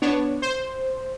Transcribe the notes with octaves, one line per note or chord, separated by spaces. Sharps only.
B3 D4 C#5
C5